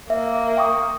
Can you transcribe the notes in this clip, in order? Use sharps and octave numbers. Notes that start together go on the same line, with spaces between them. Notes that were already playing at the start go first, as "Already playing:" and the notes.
A#3 E5
G5 C#6 D#6